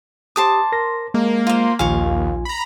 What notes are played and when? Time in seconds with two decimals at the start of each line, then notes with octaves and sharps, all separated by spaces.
0.36 G4 C5 A5 D6 D#6
0.72 A#4 C6 A#6
1.14 G#3 A#3
1.47 F4 C5
1.79 A#1 D#2 F4 F5 G#5 C#6
2.45 A#5 B5